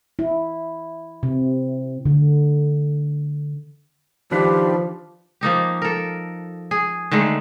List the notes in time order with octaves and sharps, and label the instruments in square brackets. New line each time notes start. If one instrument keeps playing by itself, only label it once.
[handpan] E4
C3
D3
[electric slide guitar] D#3 D4 B4 [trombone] F3 [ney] G4
[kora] F3 A#3 D#4 G4
A4 A#4
G#4
D3 D#3 G#3 A3